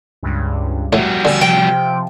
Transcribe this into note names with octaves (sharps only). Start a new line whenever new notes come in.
C#2 G2
A2 G3 F#4
D3 G#5 A5 E6
C3 F3 G5